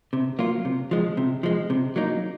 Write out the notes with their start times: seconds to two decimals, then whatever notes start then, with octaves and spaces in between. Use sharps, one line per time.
0.13 C3
0.39 F#3 A#3 F4
0.65 C3
0.91 F3 G#3
1.17 C3
1.43 F3 G#3
1.70 C3
1.96 F#3 A#3 D#4